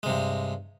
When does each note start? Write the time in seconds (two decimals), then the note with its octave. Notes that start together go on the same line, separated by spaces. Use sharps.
0.03 G#3
0.06 C3
0.09 G2